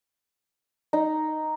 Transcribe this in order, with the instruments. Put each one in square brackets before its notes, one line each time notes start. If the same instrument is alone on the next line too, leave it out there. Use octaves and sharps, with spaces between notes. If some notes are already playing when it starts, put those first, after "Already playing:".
[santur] D#4